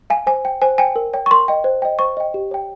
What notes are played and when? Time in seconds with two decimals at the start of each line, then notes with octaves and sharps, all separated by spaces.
0.10 F5 G#5
0.27 C5 G#5
0.45 G5
0.62 C5 G#5
0.78 G5 G#5
0.96 A#4
1.14 C#5 G5
1.26 C#6
1.31 A#4 C6
1.48 D#5 G5
1.64 C5
1.82 D#5 G5
1.99 C5 C#6
2.17 D#5 G5
2.34 G4
2.51 C#5 G5